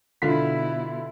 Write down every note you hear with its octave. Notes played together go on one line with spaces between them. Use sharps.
B2 D3 E4 F4 B6